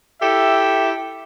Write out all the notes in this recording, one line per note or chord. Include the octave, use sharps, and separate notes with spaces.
E4 G4 A4 E5